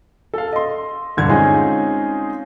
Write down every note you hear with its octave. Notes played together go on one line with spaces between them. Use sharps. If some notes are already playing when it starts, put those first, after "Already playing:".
A4 F5
D#5 C6
D#1 G2 D3 G#6
G#3 C4 C#4 D#4 F4 G#4